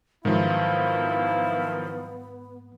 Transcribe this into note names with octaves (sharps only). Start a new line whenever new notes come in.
G#2 D#3 F3 F#3 B3 E4 F5